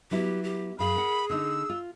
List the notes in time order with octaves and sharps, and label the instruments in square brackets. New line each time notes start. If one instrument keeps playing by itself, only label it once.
[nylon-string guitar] F#3 B3 E4 [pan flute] G4
[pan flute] G4
[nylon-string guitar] F#2 F5 [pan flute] G#4 [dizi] B5
[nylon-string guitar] A#4 F#5
[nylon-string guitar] D3 D4 D#4 [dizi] E6
[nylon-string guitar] F4